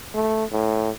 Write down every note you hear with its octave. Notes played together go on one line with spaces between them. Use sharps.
A3
A2